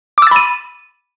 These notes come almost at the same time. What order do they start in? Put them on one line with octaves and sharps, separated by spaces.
D6 E6 A6 B5 D#7